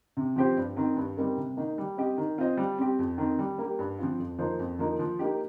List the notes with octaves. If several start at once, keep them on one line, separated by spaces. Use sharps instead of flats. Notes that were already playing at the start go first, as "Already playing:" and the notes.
C3
F3 C4 G4 C5
G2
D#3 C4
G2
G3 C4 D#4 A#4
C3
D#3 A#3 D#4
G3
C4 G4 D#5
D#3
C4 F4 C5 D#5
G3
C4 G4
F2
D#3 C4
G3
A#3 G4
G2
F3 C4 F4
F2
F3 A#3 D#4 C5
F2
F3 A#3 D#4
F3
A#3 D#4 G4